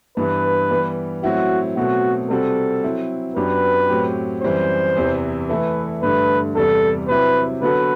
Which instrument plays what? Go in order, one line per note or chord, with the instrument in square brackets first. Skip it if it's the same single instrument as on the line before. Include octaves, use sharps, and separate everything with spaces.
[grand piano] G2 E3 B3 [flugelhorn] B4
[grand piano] E3 G3 B3
[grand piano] A2 F#3 C4 E4 [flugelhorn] F#4
[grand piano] B2 F#3 A3 C4 [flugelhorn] F#4
[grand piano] C3 G3 C4 F#4 [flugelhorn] A4
[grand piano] F#3 C4 E4
[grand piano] F#2 F#3 B3 D4 G4 [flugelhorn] B4
[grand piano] A2 F#3 C4 G4
[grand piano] F#2 E3 G3 C4 [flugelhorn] C5
[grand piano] E2 C3 E3
[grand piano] E3 A3 E4 A4 [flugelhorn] B4
[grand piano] G2 D3 A3 [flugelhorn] B4
[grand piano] E2 C3 G3 [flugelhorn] A4
[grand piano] C3 F#3 C4 E4 G4 [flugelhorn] B4
[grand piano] D3 F#3 B3 F#4 A4 [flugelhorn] B4